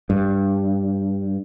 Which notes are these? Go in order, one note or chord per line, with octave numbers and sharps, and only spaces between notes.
G2